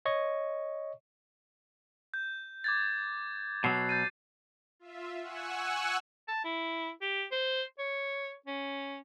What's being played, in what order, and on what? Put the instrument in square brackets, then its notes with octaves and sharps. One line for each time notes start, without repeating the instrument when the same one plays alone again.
[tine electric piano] C#5 D#5 C#6
[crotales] G6
D6 G#6 A6
[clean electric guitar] B2 F#3 [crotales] C7
[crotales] G6 A6 D#7
[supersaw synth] F4 E5
F#5 G#5 C#6 E6 F#6
[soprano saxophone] A5
E4
G4
C5
C#5
C#4